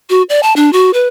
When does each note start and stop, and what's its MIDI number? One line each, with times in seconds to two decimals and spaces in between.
0.10 0.22 66
0.29 0.40 74
0.43 0.53 81
0.56 0.72 62
0.73 0.93 66
0.93 1.08 71